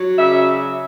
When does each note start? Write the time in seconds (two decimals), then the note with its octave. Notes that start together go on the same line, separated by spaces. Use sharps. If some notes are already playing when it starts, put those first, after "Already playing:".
Already playing: F#3
0.17 C#3 D5 E5